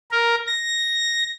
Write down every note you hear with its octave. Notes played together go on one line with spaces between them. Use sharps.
A#4
A#6